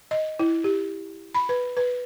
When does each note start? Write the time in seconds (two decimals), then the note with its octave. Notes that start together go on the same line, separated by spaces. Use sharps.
0.11 D#5
0.39 E4
0.64 G4
1.35 B5
1.49 B4
1.77 B4